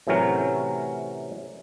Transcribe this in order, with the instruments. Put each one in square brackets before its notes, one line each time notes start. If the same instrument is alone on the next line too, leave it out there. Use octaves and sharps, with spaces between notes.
[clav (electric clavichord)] A2 C3 E3 F#3 C#4 A#4